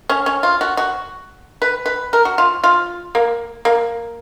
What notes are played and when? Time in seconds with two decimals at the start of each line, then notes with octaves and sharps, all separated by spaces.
0.10 C#4
0.26 C#4
0.43 F4
0.61 F#4
0.77 F#4
1.62 B4
1.86 B4
2.13 A#4
2.25 F#4
2.38 F4
2.64 F4
3.15 A#3
3.65 A#3